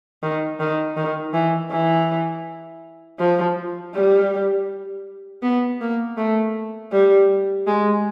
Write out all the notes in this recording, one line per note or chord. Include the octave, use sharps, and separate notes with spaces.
D#3
D#3
D#3
E3
E3
F3
G3
B3
A#3
A3
G3
G#3